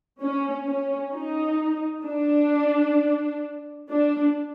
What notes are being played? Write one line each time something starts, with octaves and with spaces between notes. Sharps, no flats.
C#4
C#4
D#4
D4
D4